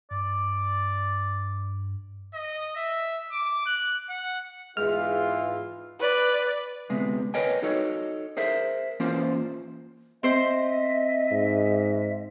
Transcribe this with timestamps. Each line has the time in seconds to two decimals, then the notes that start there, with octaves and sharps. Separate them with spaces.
0.11 G2 D5
2.34 D#5
2.76 E5
3.32 D6
3.66 F#6
4.10 F#5
4.77 E2 G#2 E3 F4 F6
6.00 B4 D5
6.89 D2 C3 G#3 B3
7.34 A#4 B4 C#5 D#5 G5 G#5
7.62 D#4 F#4 A4 C#5 D#5
8.37 G#4 A#4 C5 E5
9.00 E3 A#3 C#4 F4 C5
10.23 C4 C5 D#5 E5
11.31 G#2